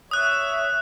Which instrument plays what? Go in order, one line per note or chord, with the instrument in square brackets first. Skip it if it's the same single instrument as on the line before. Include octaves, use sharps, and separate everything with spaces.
[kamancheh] C#5 E5 [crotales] D#6 F#6